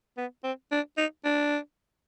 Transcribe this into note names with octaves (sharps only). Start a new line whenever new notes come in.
B3
C4
D4
D#4
D4